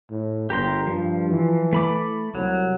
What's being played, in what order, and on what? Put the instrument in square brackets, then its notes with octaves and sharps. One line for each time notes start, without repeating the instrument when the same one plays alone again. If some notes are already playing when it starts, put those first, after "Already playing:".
[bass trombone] A2
[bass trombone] G1 [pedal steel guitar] G4 A#4 C6
[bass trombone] G2 [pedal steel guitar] F3
[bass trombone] E3
[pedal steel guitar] A3 B5 D6
[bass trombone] C2 [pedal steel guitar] F#3